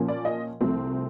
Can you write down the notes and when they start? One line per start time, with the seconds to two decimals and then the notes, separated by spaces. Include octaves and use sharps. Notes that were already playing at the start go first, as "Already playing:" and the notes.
Already playing: A#2 F3 A#3 C#4
0.08 D5
0.25 D#5
0.61 C2 C3 F3 A3 C4